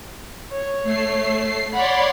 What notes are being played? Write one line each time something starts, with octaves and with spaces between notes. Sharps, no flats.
C#5
A3 C7
C#5 D5 F#5 B5 C6